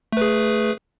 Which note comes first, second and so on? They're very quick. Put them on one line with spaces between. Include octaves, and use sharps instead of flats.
A3 B4 G#4